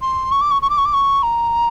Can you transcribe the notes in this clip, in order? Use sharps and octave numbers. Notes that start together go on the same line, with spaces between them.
C6
C#6
D6
C#6
C#6
D6
C#6
D6
C#6
A#5